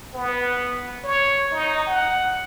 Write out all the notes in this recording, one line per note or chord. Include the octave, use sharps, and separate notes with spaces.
B3
C#5
D#4
F#5